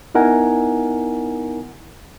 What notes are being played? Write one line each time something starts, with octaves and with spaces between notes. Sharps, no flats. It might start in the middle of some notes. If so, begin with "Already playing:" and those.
B3 D#4 E4 A#4 F#5 G#5